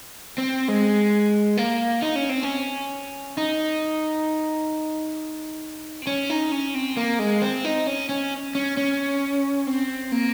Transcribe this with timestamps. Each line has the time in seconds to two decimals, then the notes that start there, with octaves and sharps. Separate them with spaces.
0.38 C4
0.68 G#3
1.57 A#3
2.02 D#4
2.16 C#4
2.29 C4
2.43 C#4
3.38 D#4
6.02 C4
6.07 C#4
6.30 D#4
6.52 C#4
6.75 C4
6.97 A#3
7.19 G#3
7.42 C4
7.65 D#4
7.87 C#4
8.09 C#4
8.55 C#4
8.77 C#4
9.67 C4
10.12 A#3